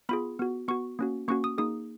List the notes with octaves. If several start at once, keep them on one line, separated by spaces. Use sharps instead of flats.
B3 F4 G#4 B5
B3 F#4
B3 F#4 C#6
A#3 C#4 F#4
A#3 C#4 F#4 C#6
D#6
A#3 D#4 G#4 D#6